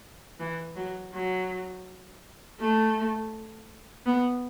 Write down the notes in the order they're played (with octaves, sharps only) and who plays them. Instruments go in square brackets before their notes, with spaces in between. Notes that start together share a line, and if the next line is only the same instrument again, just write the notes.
[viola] E3
F#3
F#3
A3
B3